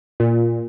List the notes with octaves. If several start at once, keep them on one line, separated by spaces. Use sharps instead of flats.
A#2